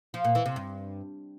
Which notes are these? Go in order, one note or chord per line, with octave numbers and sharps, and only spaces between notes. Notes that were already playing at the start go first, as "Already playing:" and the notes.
F3
A#2
E3
C3
G2